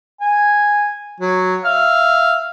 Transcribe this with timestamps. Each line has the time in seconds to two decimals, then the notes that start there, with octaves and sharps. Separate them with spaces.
0.21 G#5
1.20 F#3
1.65 E5 F5 F6